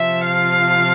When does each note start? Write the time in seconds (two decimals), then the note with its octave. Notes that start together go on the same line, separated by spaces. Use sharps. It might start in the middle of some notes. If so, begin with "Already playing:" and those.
Already playing: C3 F3 E5
0.26 F5